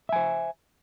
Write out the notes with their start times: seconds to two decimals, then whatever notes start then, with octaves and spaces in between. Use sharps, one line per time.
0.09 E5
0.13 G#5
0.16 C5